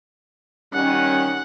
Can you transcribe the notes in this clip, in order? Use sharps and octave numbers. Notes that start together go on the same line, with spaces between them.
D#3 G3 C#4 F#5